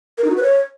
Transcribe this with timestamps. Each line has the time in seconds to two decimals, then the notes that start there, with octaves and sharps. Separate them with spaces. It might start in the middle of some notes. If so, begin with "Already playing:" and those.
0.18 A#4
0.24 D#4
0.30 F#4
0.37 B4
0.43 C#5